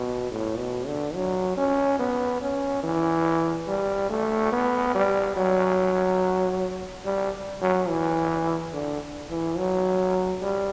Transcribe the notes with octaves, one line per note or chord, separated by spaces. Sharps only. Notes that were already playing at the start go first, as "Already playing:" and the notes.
Already playing: B2
A2
B2
D3
F#3
C#4
B3
C#4
E3
G3
A3
B3
G3
F#3
G3
F#3
E3
D3
E3
F#3
G3